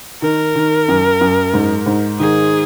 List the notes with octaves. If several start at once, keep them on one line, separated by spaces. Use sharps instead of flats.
D#3 A#4
D#3
F#2
F#2
G#2
G#2
D#3 G#4